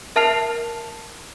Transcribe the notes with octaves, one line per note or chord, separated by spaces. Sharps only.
A#4 E5 A5 F6 C7 F7